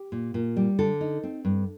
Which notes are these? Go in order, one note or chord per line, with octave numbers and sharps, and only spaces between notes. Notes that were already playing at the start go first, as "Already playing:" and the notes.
Already playing: G4
A#2
A#2
G3
D3 A4
D#4
C4
G2